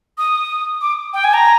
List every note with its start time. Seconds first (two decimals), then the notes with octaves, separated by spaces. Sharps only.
0.18 D#6
0.81 D6
1.14 G5
1.24 G#5
1.34 A#5